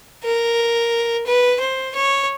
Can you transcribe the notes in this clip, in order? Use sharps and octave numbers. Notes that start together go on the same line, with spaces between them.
A#4
B4
C5
C#5